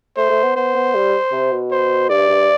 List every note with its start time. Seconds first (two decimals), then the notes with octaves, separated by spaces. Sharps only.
0.17 A3 C5
0.30 A3
0.44 B3
0.56 B3 C5
0.75 B3
0.95 G3
1.32 C3
1.52 B2
1.71 C5
2.10 G2 D5
2.29 G2